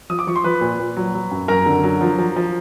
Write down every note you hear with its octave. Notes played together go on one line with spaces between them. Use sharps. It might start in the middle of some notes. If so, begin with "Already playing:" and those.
F3 D#6
D6
F3 C#6
C6
F3 B4 B5
A#2
A#2
F#3
F#3
F#2
F#2 A#4 A#5
D3
F#3
F3
F3
F3